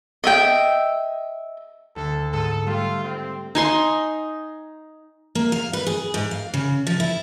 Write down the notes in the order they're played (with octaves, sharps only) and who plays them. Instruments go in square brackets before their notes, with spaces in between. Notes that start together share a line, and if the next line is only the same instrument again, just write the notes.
[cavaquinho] D#5 E5 G5
[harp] D2 [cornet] A4
[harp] G#2 E6 D#7 [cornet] A4
[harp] G3 A3 [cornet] F4
[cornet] C4
[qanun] D#4 G#5 C6
[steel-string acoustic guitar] A#3
F5
B4
G#4
G#2
F5
C#3
F3
E4